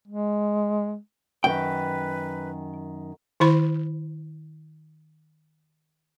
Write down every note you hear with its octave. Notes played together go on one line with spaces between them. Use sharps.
G#3
F#2 D#3 B4 G5
D#3 E4 C5 B5